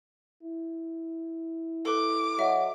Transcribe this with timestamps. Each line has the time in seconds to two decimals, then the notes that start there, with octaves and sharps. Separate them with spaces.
0.43 E4
1.85 A4 B4 D6
2.39 F#3 D#5 E5